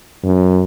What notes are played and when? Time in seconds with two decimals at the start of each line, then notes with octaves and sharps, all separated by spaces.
0.24 F#2